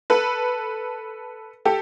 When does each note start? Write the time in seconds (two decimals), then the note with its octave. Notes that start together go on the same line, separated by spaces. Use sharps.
0.10 A4 B4
1.65 G4 A4